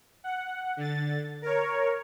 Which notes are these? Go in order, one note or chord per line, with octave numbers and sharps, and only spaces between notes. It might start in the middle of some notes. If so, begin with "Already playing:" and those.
F#5
D3 A6
A#4 C#5